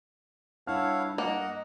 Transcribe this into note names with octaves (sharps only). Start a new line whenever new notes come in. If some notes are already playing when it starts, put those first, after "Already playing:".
G2 E4 C#5 F5 F#5 A5 F6
A#3 D#5 F#5